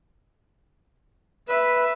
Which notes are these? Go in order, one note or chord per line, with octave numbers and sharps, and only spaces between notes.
B4 E5